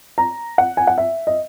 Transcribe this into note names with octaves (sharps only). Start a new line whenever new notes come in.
A#5
F#5
G#5
F#5
E5
D#5